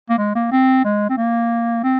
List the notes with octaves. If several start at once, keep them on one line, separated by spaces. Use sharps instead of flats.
A#3
G#3
A#3
C4
G#3
C4
A#3
C4